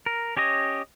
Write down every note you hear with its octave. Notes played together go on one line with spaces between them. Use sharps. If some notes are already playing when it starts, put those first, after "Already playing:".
A#4
C#4 G4 C#5 D#5